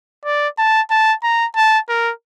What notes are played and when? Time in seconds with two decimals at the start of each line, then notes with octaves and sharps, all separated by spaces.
0.25 D5
0.58 A5
0.91 A5
1.23 A#5
1.56 A5
1.89 A#4